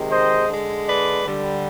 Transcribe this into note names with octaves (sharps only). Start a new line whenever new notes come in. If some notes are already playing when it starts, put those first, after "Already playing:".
Already playing: C3 D#3 G#3
C5 D#5
D3 G#3
B4 D5
D3 G3